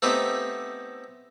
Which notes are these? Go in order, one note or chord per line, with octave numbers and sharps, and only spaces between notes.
A3 B3 C4 D#4 G4 E5